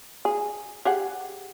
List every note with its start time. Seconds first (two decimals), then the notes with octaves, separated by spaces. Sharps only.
0.25 G#4
0.85 G4 G#4 F#5